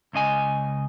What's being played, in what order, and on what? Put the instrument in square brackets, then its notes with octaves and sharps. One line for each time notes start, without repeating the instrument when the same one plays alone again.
[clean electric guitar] C#2 C#3 D#5 G#5